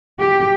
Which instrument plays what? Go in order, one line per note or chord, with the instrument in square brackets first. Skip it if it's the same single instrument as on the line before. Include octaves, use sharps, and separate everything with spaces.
[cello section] G4